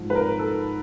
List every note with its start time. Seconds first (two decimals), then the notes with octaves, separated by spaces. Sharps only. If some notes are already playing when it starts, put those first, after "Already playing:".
Already playing: G#2 F3
0.10 B4
0.15 A#4
0.39 A4